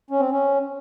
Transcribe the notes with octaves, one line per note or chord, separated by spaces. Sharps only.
C#4
C4
C#4